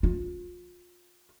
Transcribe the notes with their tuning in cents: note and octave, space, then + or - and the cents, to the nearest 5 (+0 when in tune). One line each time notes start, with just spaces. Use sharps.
F4 +30